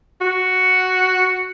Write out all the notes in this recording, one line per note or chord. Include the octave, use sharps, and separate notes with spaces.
F#4